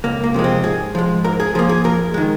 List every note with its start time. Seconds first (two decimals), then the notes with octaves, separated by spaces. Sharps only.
0.04 C#2 A#3
0.24 A#3
0.34 C3 F3 G#3
0.44 C4
0.64 G#2 G#4
0.95 F3 G#3
1.25 G#2 A#4
1.40 G#4
1.55 F3 A#3 G#4
1.69 G#4
1.84 F2 A#4
2.14 D#3 G#3